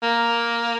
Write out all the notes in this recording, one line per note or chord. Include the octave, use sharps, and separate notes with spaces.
A#3